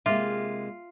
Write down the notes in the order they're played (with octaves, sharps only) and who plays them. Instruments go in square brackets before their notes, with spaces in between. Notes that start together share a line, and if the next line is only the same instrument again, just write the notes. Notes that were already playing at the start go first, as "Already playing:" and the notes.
[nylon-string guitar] C3 G#3 A#3 [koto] F4 [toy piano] E5 G5 D6